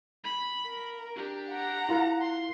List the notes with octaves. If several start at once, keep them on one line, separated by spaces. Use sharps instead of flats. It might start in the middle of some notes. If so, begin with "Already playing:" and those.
B5
A#4
D4 G4
F#5 A#5
E4 F4 A#4
C6